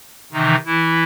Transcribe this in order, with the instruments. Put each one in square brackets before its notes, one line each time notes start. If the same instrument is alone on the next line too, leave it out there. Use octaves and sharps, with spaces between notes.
[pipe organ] C3 D#3 E3 D#4
E3 E4